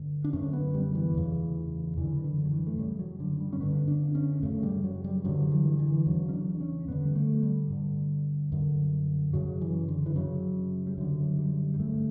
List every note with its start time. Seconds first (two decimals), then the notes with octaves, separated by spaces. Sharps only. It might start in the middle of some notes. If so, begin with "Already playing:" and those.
Already playing: G2 D3
0.24 D4
0.33 F#2 D3 C#4
0.53 B3
0.74 G3
0.95 E3
1.15 E2 C#3
1.97 F#2 D3 E3
2.17 E3
2.24 D3
2.45 F#3
2.51 E3
2.67 A3
2.78 F#2 C#3 G3
2.99 F#3
3.20 D3
3.40 G3
3.53 C#4
3.60 G2 D3 B3
3.88 D4
4.15 C#4
4.43 F#2 C#3 A3
4.63 G3
4.84 F#3
5.04 G3
5.25 G2 D3 F#3
5.52 E3
5.79 E3
6.06 E2 C#3 F#3
6.29 C#4
6.33 D4
6.61 C#4
6.88 G2 D3 B3
7.04 G3
7.15 A3
7.34 F#3
7.43 G3
7.70 G2 D3
8.52 F#2 D3
9.33 F#2 C#3 F#3
9.61 E3
9.88 D3
10.06 E3
10.16 F#2 C#3 F#3
10.87 G3
10.98 F#2 D3 F#3
11.39 G3
11.74 G3
11.79 G2 D3 A3